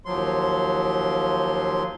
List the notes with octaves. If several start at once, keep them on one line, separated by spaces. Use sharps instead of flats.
D#2 F3 F#3 C6